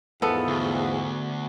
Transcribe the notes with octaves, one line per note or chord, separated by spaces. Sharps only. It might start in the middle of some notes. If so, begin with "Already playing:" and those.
E2 G#2 F3 B3 A4
D2